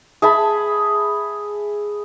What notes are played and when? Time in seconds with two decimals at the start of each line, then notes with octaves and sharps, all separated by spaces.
0.22 G#4 E5 A5 B5